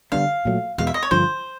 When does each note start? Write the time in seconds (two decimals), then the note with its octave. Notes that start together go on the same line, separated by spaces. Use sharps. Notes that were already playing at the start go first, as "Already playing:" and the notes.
0.12 D3 G3 B3 D4 F5
0.45 A#2 F#3 A3
0.78 E2 B2 G#3 F5
0.87 E5
0.94 D#5
1.03 C#5
1.11 G2 D3 F3 C5